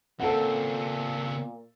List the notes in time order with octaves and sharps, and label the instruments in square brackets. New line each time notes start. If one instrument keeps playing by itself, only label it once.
[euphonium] A#2 [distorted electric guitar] C#3 C4 [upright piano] A4 F#5